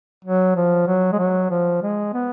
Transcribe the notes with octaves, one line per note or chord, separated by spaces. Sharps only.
F#3
F3
F#3
G#3
F#3
F3
G#3
B3